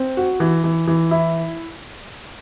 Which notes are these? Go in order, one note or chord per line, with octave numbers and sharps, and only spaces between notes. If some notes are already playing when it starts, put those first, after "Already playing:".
Already playing: C4
F#4
E3
E3
E3
E4